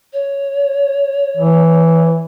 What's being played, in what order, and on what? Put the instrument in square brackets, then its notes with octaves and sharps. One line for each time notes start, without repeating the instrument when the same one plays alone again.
[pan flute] C#5
[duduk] E3